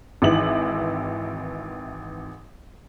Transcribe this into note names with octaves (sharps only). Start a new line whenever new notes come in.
G#1 D#3 E3 E5 F#7